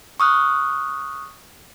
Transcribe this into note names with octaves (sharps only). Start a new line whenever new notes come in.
C#6 D#6 F6 F#6